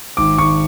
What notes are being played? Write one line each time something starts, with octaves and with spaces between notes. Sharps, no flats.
G#1 D6
G#1 C#6